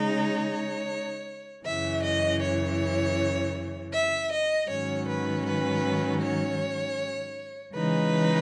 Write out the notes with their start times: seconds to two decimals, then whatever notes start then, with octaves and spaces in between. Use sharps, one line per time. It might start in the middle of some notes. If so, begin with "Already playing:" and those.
Already playing: C#3 G#3 D#4
0.13 C#5
1.65 F#2 C#3 E3 E5
2.03 D#5
2.41 C#5
3.93 E5
4.31 D#5
4.69 G#2 D#3 F#3 C#4 C#5
5.07 B4
5.45 B4
6.21 C#5
7.73 C#3 E3 G#3 D#4 B4